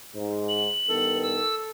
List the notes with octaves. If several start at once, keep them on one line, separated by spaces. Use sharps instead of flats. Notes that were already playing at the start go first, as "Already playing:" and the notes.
G#2
F#7
G2 D#3 B3 A4
E6